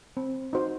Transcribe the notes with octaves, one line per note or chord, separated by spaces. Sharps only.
C4
D#4 F#4 C5